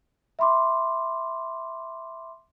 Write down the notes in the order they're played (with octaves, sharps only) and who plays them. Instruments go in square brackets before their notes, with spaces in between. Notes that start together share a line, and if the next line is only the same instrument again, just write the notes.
[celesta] E5 B5 C6 D6